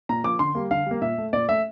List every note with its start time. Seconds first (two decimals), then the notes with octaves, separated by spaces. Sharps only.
0.09 A#2 A#5
0.24 F3 A#3 D6
0.39 D3 C6
0.55 G3 A#3
0.71 D3 F5
0.86 G3 A#3
1.02 A#2 E5
1.18 A3
1.33 A#2 D5
1.48 A3 E5